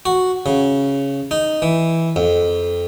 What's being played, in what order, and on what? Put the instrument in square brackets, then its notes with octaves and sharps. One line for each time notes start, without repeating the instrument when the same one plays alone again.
[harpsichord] F#4
C#3
D#4
E3
F2